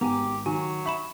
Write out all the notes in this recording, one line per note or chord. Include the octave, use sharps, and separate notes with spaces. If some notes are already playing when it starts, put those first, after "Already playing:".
G#1 B3 G4 G#5 A#5
D#3 F#3 F#4 G#5
E5 B5 C#6 E7